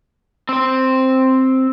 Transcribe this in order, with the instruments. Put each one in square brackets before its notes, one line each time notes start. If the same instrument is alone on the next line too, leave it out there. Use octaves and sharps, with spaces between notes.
[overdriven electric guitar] C4 C5